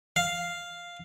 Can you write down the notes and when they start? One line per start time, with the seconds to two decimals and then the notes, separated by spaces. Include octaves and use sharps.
0.16 F5